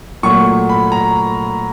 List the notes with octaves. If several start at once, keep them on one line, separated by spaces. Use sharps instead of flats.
A#2 F#3 A3 C#6
B5
A#5